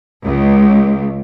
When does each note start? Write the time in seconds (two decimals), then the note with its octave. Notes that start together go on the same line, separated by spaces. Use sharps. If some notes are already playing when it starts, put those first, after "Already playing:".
0.25 C#2